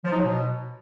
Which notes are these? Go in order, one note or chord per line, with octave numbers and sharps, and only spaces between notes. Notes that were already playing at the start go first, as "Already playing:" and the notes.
F3
D#4
F#3
B2